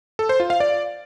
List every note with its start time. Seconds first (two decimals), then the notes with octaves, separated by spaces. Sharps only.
0.19 A4
0.29 C5
0.40 F4
0.50 F5
0.60 D5